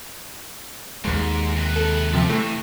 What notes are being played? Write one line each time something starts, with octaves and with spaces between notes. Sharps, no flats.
D#2 G#2 G#3
C3 B4
A4
C3 F3 A4 B5
C3 E3 A3